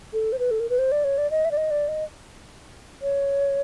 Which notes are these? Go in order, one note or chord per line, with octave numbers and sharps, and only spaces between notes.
A4
C5
B4
A4
A#4
B4
C5
D5
C#5
D5
D#5
E5
D5
D#5
D5
D#5
C#5